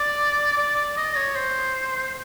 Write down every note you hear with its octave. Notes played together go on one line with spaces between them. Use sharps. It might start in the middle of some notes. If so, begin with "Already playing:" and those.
Already playing: D5
D5
D5
D#5
C#5
C5